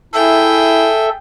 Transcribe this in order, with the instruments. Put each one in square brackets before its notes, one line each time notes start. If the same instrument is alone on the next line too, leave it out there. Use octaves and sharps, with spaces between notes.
[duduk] E4 [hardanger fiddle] G#4 G5 [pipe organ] A4 E5